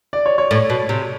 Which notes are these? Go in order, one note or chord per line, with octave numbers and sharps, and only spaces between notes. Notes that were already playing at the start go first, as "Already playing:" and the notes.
D5
C#5
C#5
A2
B2
C3